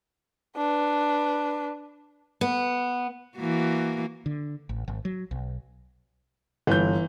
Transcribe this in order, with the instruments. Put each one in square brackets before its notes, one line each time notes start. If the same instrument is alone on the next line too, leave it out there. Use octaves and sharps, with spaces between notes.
[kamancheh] D4 B4
[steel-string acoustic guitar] B3
[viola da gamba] E3 A#3 F#4
[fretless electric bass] D3
A1
G#1
F#3
B1
[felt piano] G1 [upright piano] E3 G6